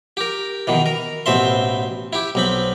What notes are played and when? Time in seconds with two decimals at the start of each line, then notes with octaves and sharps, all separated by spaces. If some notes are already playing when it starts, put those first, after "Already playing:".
0.17 G4 A#4
0.67 B2 D#3 E3
0.86 A#4
1.26 A1 B2 C4 E5 C6
2.13 E4 G4
2.35 B1 C4 B5